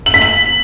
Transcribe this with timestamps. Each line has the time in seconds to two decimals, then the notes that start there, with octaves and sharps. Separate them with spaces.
0.06 F#7
0.14 B6
0.22 F#7